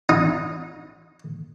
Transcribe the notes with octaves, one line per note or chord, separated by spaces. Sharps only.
D#4